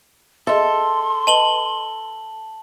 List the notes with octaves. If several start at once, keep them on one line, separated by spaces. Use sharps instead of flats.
G#4 A4 D#5 E5 C6
B4 D#5 A5 F#7 G7